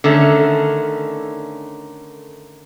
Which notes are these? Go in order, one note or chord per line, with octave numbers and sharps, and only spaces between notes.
D3 D#3 A3 C#4